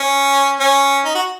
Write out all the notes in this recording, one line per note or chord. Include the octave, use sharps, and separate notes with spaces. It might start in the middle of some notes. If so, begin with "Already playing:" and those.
Already playing: C#4
C#4
D#4
F#4